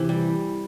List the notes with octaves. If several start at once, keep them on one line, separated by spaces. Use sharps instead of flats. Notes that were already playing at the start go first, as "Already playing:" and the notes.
Already playing: C3 E3
G3